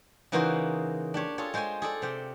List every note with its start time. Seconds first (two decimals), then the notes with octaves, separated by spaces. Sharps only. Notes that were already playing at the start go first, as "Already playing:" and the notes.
0.32 C#3 E3 A#3 D#4 F#4 C5
1.14 D4 G4 C#5
1.38 F4 G#4 A4 C#5
1.54 G#3 C5 C#5 G5 G#5
1.82 G#4 A4 D5
2.02 C3 C5 G5